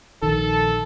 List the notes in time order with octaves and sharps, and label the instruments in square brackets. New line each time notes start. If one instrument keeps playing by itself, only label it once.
[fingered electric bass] A#1 D#3 [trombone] A4